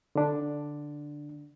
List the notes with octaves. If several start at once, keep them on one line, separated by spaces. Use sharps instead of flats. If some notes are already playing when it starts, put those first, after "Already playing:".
D3 D4